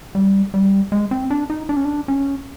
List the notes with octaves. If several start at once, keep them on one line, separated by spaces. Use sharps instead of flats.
G3
G3
G#3
C4
D4
D#4
D4
C#4
D4
C#4